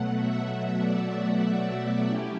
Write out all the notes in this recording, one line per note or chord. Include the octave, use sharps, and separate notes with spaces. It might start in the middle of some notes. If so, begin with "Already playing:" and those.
Already playing: B2 F#3 A3 F#5
E5
D5
E5
F#3 A3 C#4 E4 G4